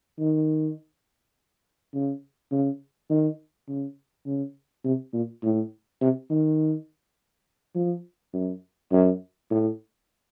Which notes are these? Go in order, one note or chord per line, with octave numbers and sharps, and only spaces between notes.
D#3
C#3
C#3
D#3
C#3
C#3
C3
A#2
A2
C3
D#3
F3
F#2
F#2
A2